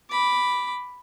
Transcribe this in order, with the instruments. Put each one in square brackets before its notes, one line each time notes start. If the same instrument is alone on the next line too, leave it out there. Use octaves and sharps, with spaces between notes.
[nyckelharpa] B5 D6